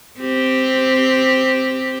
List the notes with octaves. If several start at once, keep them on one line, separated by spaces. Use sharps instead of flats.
C4 G4